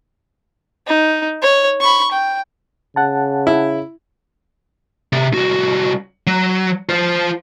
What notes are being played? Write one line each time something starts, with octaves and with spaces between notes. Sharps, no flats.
D#4
C#5
B5 C#6
G5
C#3 F#5 A5
E4
C3
C2 F#4
F#3
F4 C5